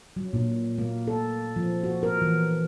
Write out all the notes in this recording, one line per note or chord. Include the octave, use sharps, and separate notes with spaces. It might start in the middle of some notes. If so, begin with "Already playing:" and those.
F#3
A#2
A#3
A4
F3
F#4
A#4
E3